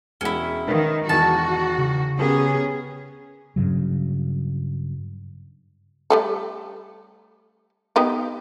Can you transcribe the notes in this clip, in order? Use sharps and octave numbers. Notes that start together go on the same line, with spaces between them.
E1 G#3 C#4 E4 F#5
D#3 A#4 B4 F5
E1 D#3 E3 F#4 A5
C#3
B3 C#4 G4 G#4 A#4
G2 C#3 F#3
G3 A3 A4
B3 D#4 G4